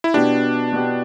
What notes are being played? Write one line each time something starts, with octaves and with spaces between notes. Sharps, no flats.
E4
B2 B3 D4 G4
B2 B3 G4